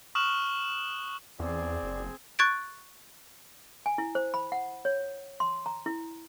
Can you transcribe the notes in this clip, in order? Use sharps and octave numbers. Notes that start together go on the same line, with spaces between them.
C#6 D#6 F6 F#6 E7 F#7
E2 C4 G#4 D5
F#1
C#6 F#6 G#6 A6 D7
G#5
E4
C5
B5
F#5
C#5
C6
A#5
E4